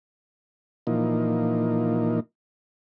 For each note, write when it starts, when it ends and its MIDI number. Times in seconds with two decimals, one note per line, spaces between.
0.87 2.20 46
0.87 2.20 52
0.87 2.20 53
0.87 2.20 58
0.87 2.20 63